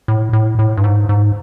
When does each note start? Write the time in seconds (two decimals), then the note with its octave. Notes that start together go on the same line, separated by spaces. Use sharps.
0.08 A2
0.33 A2
0.59 A2
0.77 G2
0.84 G#2
1.09 G#2